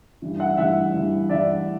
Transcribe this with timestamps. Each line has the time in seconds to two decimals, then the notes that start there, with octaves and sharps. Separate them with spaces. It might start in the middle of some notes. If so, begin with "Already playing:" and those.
0.22 G2 E3
0.39 E5 F#5
0.57 G2 E3 E5 F#5
0.93 G2 E3
1.29 G2 E3 D5 E5